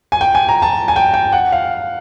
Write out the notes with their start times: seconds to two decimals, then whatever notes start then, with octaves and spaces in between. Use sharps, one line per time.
0.12 G#5
0.21 G5
0.35 G#5
0.49 A#5
0.62 A5
0.88 G#5
0.96 G5
1.14 G5
1.32 F#5
1.52 F5